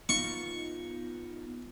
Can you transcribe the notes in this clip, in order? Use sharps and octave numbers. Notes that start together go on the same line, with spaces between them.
B3 D#4 F4 C#6